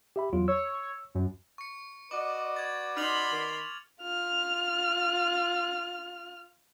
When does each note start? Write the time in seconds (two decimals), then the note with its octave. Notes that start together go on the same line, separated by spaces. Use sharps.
0.16 G4 E5 B5
0.33 E2 F#3 F4
0.48 C#5 E6
1.15 F#2
1.58 C#6 C#7
2.11 F#4 B4 D5 D#5 D6
2.56 G#6 A6
2.97 D#4 B5 C6 F6 F7 F#7
3.32 D#3
4.02 F4 F6